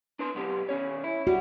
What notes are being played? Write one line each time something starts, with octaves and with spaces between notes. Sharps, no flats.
D4 B4 C6
B1 B3 G4
D#3 C#4 C#5
E4
G3 F#4